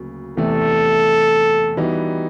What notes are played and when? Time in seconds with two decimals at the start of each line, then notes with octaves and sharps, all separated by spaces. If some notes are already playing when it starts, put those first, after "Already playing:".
Already playing: D2 C#3 F#3 A#3
0.37 E2 C3 E3 A3 A4
1.77 E3 G3 B3 D#4 F#4